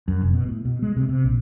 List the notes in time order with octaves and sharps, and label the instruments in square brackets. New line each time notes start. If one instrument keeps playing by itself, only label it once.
[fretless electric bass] F#2
F1
B2
A2
B2
G#3
C3
C3
A#1